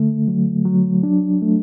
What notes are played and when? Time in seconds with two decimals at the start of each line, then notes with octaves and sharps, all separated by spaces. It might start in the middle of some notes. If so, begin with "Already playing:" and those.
Already playing: D3 A3
0.28 F#3
0.65 F#3
1.03 D4
1.42 A3